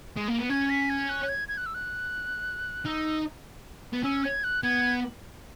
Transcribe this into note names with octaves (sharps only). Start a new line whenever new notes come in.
G#3
A#3
B3
C#4 G#6
B6
G#6
F#6
G#6
G#6
F#6
E6
F#6
D#4 E6
B3
C#4 E6
G#6
F#6
B3 G#6